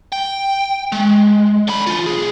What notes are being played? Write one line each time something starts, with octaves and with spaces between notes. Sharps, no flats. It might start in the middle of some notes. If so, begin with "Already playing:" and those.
G5
G#3
D3 B5
E3 F4
B1 G#4